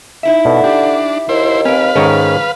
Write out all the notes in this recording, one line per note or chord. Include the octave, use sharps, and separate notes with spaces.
D#4 E4 E5
B2 D3
D4 G4
D#2 E4 C5
C4 A#4 B4 F5 G#5
G#2 D#3 C#4 A4 G#5 A#5